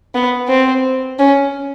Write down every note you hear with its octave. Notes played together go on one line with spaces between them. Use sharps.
B3
C4
C#4